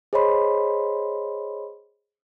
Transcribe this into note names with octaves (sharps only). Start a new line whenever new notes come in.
G#4 C5 C#5 D#5 B5 C6